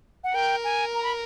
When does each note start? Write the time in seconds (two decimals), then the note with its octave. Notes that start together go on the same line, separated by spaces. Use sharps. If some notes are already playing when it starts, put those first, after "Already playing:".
0.24 F#5
0.34 A#4 G5
0.64 G#5
0.95 A#5
1.03 B5